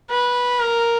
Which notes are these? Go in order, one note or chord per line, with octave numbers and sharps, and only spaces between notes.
B4
A#4